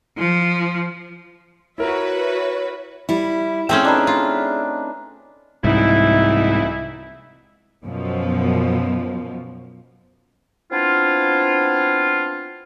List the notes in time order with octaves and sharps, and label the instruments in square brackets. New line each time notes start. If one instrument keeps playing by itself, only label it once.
[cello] F3
[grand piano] E4 A#4 [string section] F#4 B4 E5 [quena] C#5
[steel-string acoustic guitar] G3 E4
[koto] A3 C4 C#4 [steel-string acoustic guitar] G#4 E5 G5
[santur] D4 D#4 B4
[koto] F4
[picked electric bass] C2 G#2 [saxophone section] E3 D#4 E4
[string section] F#2 B2 F3
[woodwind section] B3 C4 D4 E4 F4